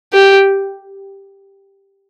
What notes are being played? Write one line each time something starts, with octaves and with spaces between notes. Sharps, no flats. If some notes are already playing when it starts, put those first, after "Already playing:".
G4